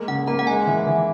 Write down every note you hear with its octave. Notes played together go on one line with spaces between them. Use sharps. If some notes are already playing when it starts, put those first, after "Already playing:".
Already playing: G#3 A#3
C#3 F#5
A#3 A#5
F#5
G#3 G#5
E3
E3